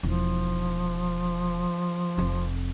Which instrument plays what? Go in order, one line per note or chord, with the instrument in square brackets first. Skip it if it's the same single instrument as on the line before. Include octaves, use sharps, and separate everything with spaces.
[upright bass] E1 D#4 [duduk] F3
[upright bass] F1 F2